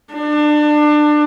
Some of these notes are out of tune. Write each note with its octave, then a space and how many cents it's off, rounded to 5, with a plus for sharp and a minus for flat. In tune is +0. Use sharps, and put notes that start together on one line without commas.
D4 +25